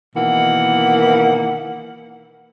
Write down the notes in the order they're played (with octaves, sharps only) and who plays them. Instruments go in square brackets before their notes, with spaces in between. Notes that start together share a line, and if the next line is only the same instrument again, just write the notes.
[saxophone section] B2 D#3 E3 A#3 F#5